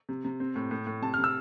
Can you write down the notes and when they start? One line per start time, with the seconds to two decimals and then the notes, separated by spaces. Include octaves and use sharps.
0.09 C3
0.24 C3
0.40 C4
0.56 A2
0.71 A2
0.87 A2
1.02 C3 A5
1.14 F6
1.18 C3
1.24 E6